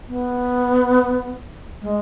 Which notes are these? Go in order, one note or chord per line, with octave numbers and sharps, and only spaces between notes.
B3
G#3